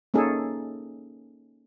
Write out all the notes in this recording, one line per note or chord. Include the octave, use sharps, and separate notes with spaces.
A#3 C#4 D#4 G#4 A4